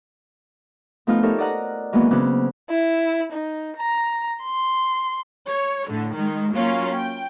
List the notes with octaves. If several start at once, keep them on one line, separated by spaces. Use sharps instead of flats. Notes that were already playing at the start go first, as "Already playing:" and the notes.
F3 A3 B3 D#4 F4
D#4 G4 A4 A#4 C#5 E5
D5 D#5 F#5 A#5 F#6
D#3 E3 F#3 G#3 A#3 B3
C#3 F#3 B3 C4 D6 F#6
E4
D#4
A#5
C6
C#5
A2 D3
D#3 G#3
F#3 A#3 C#4 F4 F5
G5